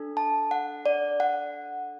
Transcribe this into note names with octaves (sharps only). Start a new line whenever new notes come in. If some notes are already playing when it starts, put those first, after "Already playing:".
Already playing: D4 A4
A5
F#5
D5
F#5